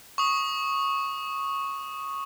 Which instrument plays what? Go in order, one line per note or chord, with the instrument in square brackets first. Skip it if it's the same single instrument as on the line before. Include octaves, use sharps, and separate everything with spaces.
[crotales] C#6 D#6